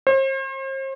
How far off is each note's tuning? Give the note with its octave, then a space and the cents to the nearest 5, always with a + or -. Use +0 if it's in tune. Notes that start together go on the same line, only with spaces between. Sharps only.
C5 +40